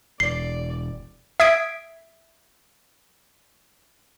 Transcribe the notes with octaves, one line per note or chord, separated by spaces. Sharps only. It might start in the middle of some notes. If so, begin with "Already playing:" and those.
E1 D5 C7
E5 D#6 G#6 B6 C7 D7